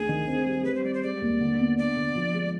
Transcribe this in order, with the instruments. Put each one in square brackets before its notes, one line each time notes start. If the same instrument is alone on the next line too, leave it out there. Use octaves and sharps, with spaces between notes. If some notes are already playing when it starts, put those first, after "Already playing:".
Already playing: [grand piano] D2 D4 [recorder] G#4
[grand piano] D#3
C4
G3
[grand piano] G3 [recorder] B4
[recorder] C5
[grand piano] G3 [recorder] D5
[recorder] C5
[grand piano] G#3 [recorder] D5
[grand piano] D#2
D3
B3
[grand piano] D4 [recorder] D5
[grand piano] D3
F3
G#3